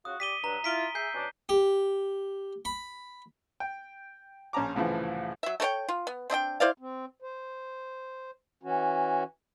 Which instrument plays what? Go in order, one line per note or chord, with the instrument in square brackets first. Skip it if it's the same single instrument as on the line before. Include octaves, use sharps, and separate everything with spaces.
[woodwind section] C#3 F4 F#4 [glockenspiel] D#6
[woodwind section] G4 D5 [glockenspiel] B6 D#7 G7
[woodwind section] G2 F#3 [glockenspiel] A#5
[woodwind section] E4 F4 [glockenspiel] B6 D7 G7
[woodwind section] G#4 E5 [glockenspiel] G6 C7
[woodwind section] B2 C#4 D4
[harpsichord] G4
B5
[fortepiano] G5
A#1 C#4 A5 A#5 D6
C2 A2 C#3 E3 F3
[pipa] F#3 E5
A3 A4 C#5 G5
F4
B3
C4 D4 D#5 G5
E4 C5 D5 F5
[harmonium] C4
C5
E3 C#4 F#4